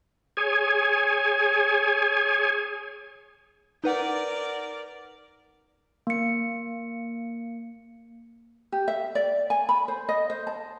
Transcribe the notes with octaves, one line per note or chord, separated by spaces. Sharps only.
G#4 C#5 G#5
D#4 A#4 B4 D5 F#5
A#3 C#7
G4
E5
D5
G#5
B5
C5
D#5
C5
A5